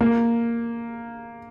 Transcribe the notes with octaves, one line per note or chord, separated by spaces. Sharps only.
A#3